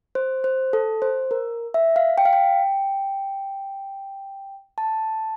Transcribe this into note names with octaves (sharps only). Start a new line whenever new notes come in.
C5
C5
A4
C5
A#4
E5
F5
G5
F5
G5
A5